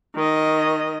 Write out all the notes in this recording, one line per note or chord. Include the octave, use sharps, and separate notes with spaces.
D#3 D#5